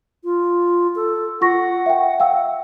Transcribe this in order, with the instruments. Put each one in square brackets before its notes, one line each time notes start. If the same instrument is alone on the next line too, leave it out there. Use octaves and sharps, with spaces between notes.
[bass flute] F4
A4
[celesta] F4 C#6 A#6 [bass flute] F#5
[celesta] E5 G5
F5 G5 E6